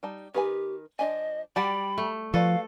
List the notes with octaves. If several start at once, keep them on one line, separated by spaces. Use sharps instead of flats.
G3 D#4 A5
D#3 G4 B4 G#5
F3 D4 D#5 G#5
G3 D5 F#5 G5 A5 B5
A3
F3 F#4 A4 B4 D5 F5